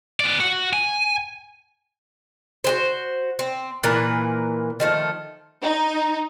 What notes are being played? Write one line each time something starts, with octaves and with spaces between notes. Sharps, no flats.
B3 D5
F#4 F#5
G#5
F#4 G#4 C5
C4
A#2 E3 A#4 B4
D#3 F3 A3
D#4